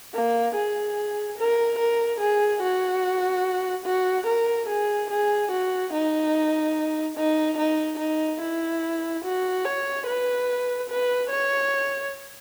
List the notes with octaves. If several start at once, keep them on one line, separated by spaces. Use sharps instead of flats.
A#3
G#4
A#4
A#4
G#4
F#4
F#4
A#4
G#4
G#4
F#4
D#4
D#4
D#4
D#4
E4
F#4
C#5
B4
B4
C#5